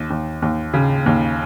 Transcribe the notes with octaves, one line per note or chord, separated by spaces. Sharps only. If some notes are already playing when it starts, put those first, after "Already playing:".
Already playing: D#2
D#2
D#2
C#3
D#2